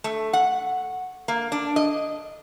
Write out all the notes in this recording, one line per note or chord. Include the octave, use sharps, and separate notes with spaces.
A3
F#5
A#3
D4
D#5